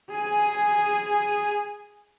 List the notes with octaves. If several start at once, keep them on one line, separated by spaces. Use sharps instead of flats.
G#4 G#5